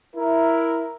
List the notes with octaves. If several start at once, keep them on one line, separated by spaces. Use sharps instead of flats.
E4 A#4